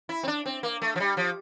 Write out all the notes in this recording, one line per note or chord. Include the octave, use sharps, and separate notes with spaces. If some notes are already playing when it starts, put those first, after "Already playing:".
E4
C4
D4
C4
A#3
A3
F3
G3
F3